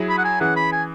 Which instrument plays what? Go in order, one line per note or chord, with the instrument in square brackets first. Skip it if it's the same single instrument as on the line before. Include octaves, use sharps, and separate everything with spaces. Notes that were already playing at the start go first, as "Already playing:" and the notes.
Already playing: [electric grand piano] F#3 E4 G#4
[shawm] B5
F#5
G#5
[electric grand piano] E3 C#4 G#4 [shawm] F#5
[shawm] B5
G#5